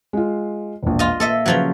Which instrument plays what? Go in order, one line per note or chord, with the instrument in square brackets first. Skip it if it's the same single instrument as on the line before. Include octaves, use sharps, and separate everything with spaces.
[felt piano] G#3 F4
E1 A#1
[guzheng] F4 D#5
[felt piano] A#2 [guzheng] A4 D#5 E5
[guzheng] C#3 F3 F#3